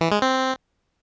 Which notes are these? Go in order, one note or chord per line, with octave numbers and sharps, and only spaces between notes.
E3
G#3
C4